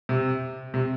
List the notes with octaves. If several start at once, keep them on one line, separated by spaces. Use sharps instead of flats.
C3
C3